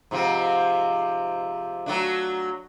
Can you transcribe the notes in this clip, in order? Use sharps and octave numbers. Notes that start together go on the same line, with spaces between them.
G#2 C3 F3
F#3 A3 D4